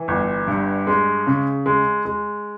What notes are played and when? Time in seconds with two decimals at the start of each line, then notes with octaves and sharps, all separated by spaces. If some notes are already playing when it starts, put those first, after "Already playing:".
Already playing: E3
0.08 G1
0.47 G2
0.87 G#3
1.27 C#3
1.66 G#3
2.05 G#3